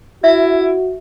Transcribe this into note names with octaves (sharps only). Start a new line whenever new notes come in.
E4 F#4 E5